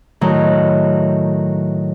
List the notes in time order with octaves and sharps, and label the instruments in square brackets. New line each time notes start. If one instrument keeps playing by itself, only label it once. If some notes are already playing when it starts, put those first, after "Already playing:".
[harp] A2 D#3 F#3